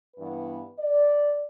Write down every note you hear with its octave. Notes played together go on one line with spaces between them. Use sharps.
G2 E3 B3 B4
D5